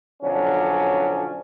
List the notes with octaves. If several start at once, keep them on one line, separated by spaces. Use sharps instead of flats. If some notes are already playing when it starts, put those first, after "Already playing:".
B1 D3 F3 F#3 C#4 D4